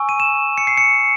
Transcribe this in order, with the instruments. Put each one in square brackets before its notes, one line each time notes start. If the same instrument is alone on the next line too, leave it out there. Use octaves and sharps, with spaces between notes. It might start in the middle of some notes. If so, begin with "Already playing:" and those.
Already playing: [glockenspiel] G#5 C#6 E6
D#7
E7
C#7
C7
C#7